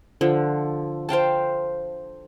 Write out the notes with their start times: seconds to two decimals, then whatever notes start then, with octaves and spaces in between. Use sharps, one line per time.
0.21 D3 F3
1.09 C5 F5 G5 A5